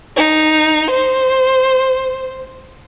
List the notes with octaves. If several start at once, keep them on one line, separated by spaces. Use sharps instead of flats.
D#4
C5